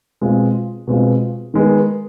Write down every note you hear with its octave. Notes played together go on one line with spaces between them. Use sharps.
B2 G#3 C4 F4
B2 G#3 C4 F4
D#3 G#3 B3